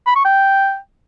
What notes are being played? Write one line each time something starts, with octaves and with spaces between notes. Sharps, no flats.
B5
C#6
G5